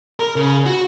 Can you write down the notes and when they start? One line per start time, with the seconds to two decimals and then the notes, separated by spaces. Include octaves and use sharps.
0.20 A#4
0.36 C#3
0.66 F#4